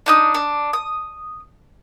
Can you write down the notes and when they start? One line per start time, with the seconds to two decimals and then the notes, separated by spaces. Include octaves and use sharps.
0.06 D4 D#4 D#6
0.34 D4
0.73 D#6